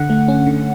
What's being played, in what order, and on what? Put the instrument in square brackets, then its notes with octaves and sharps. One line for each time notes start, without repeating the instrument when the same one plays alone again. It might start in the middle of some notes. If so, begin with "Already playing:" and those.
Already playing: [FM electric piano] D3 F#5
A3
C#4
D3